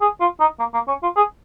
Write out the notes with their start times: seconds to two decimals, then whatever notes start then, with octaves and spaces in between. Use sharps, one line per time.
0.01 G#4
0.20 F4
0.40 D#4
0.59 A#3
0.74 A#3
0.88 C#4
1.03 F4
1.16 G#4